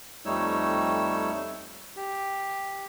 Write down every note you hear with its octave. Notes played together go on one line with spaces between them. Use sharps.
F2 G3 A3 D#4 C#5 E6
G4